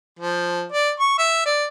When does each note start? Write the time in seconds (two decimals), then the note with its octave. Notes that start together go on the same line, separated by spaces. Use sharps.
0.19 F3
0.72 D5
1.00 C#6
1.18 E5
1.45 D5